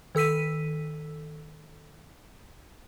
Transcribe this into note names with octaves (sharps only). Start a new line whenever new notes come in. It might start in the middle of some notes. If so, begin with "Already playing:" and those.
D#3 A4 E6 B6 D#7